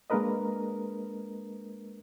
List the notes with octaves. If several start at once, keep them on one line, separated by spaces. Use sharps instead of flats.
G#3 A#3 D4 A#4 B4 D#5